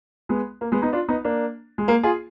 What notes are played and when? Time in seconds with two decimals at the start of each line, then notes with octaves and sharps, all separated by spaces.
0.29 G#3 B3
0.61 A#3
0.72 G#3 B3
0.82 B3 D#4
0.93 D4 F4
1.08 B3 D#4
1.24 A#3 D4
1.78 G#3
1.88 A#3
2.03 F4 G#4